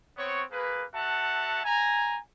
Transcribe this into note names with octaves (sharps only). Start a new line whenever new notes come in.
B3 C4 C#5
A#3 G#4 B4
F#4 A4 E5 F#5 A5
G#5 A#5